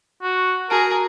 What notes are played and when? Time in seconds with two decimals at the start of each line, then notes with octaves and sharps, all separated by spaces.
0.23 F#4
0.70 F#4 G#4 A#4 A5 D7